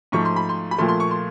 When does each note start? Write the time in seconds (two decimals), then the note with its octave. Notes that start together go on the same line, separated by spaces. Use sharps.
0.12 G#2 F3 A3 C#6
0.25 C6
0.36 B5
0.49 C6
0.71 B5
0.78 A#2 F3 A3 C6
0.88 C6
1.00 C#6
1.11 C6